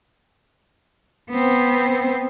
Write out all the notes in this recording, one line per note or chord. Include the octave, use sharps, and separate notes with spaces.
B3 C4